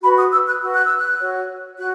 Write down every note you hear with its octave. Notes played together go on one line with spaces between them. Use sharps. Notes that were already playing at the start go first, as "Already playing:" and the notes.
F#4 B4 B5
D#6
E6
F#6
F#4 B4
F#6
E6
F#6
F#4 C#5
F#4 F#6